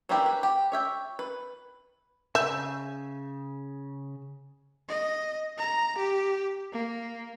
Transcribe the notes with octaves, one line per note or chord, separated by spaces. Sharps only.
E3 A#3 D4 E4 G4
B4
G4
C#5 E5 G5
B4
C#3 E5 G#5 G6
D#5
A#5
G4
A#3